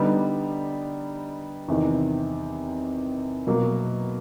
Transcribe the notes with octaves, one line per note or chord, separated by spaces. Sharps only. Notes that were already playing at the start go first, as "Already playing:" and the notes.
Already playing: D3 G3 B3 D#4
E2 C3 D#3
B2 F#3 A#3